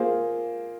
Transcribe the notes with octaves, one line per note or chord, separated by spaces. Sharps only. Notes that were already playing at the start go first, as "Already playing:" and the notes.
Already playing: A#3 F4 G#4 C5